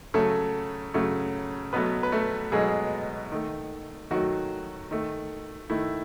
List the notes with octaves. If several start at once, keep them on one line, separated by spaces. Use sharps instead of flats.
C#3 F#3 A3 A4
C#3 F#3 A3
B2 F#3 A3 B3 B4
B4
A3 A4
B2 F#3 G#3 A3 G#4
D#3 A3
D#3 F#3 A3 F#4
D#3 A3
D#3 A3 E4